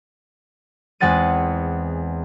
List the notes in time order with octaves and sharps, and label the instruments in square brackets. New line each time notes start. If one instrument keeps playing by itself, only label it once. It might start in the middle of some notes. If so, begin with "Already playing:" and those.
[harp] E2 G#3 C4 F#5 A6 D#7